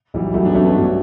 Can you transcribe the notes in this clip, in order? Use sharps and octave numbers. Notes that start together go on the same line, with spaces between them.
B1 E3 G3
B1 F#3 A3
B3 D4
B1 A3 C#4
B3 D4
G2